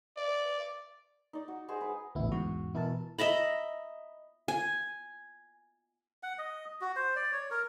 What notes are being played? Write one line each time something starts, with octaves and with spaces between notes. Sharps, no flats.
D5
D#4 D5
F#4
F#4 G#4 C5 D#5
G#3 B4
A1 D2 B3 E4
E2 G#2 F#4
B2 E3 E4 A#4 A5
D#5 E5 A#5 B5
G#5
F#5
D#5
F#4
C5
D5
C#5
A#4